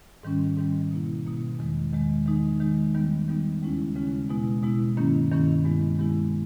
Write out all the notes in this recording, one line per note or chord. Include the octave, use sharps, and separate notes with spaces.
G#2 D#3 G3 C#4
G#2 D#3 G3 C#4
B2 A#3 E4
B2 A#3 E4
E2 D#3 G#3
E2 D#3 G#3
D#3 G#3 D#4
D#3 G#3 D#4
D#3 G3 B3 D#4
D#3 G3 B3 D#4
D#2 C#3 G#3 C#4 E4
D#2 C#3 G#3 C#4 E4
B2 G#3 B3 E4
B2 G#3 B3 E4
G2 D#3 A#3 C#4 E4
G2 D#3 A#3 C#4 E4
G2 D#3 G#3 B3 E4
G2 D#3 G#3 B3 E4